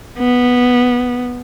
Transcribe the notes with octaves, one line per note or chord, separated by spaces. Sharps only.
B3